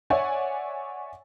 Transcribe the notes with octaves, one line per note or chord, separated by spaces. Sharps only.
C#5 D5 E5 F#5 G#5